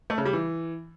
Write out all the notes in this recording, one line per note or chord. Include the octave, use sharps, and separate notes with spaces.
A3
C#3
G3
E3